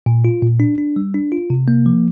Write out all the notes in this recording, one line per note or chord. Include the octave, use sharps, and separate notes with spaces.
A#2
F4
A#2
D4
D4
G3
D4
F4
C3
A#3
F3